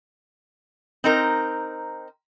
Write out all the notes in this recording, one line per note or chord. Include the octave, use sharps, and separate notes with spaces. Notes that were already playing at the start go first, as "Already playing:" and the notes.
C4 D#4 A#4